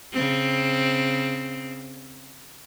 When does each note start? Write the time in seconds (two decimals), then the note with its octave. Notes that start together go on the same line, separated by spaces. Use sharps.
0.13 C#3 C4